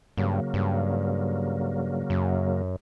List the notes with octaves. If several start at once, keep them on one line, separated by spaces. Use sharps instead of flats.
G2 C#3 F#3 A#3
G2
F#2